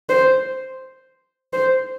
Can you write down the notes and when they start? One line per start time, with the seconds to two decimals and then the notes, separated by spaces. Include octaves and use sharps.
0.09 C5
1.53 C5